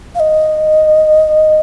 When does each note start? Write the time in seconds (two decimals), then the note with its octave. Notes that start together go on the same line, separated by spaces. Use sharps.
0.15 F5
0.20 D#5